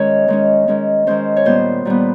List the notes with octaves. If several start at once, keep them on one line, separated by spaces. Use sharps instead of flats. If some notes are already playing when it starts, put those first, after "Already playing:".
Already playing: D#3 G#3 C#4 C#5
D#3 G#3 C#4
D#3 G#3 C#4
D#3 G#3 C#4 C5
C#5
A#2 G3 B3 C5
A#2 G3 B3